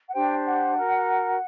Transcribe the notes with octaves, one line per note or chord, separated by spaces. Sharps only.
F#5
D4 G4 C5 G5
F#5
F#4 A#4